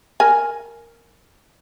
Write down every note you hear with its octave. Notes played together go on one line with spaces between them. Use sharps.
A#4 G#5